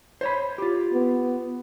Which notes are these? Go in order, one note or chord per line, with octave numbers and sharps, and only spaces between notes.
C5 C#5 B5
F4 G4
B3